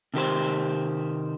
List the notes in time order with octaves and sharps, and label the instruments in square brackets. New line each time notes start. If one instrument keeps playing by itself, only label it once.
[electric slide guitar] C3 D#3 G4 C5